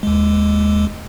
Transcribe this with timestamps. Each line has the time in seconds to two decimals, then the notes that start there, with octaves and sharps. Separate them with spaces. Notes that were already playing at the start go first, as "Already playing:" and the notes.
0.03 D#2 G#3